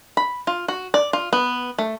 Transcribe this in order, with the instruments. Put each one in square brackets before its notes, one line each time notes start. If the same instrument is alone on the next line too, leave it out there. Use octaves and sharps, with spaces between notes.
[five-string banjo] B5
F4
F#4
D5
F4
B3
A3